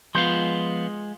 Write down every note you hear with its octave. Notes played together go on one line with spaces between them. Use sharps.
F3 G#3 B3 F4 C6 G6